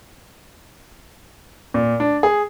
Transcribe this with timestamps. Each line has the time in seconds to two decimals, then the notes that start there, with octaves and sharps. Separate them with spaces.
1.74 A#2
2.00 D4
2.23 G#4